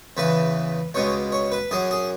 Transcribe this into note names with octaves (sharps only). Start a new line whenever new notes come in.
E2 C#3 E3 B4
C#2 B2 G#3 C#5
C#5
B4
F#2 F#3 G#4
G#4